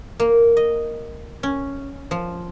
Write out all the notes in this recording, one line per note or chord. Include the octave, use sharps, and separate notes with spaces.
A#3
D#5
C#4
F3